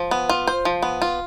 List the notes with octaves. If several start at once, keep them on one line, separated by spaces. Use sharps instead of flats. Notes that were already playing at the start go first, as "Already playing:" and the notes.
Already playing: F3
B3
F4
C5
F3
B3
F4